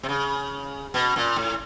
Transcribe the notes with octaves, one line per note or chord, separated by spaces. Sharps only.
C3
C#3
B2
A#2
A2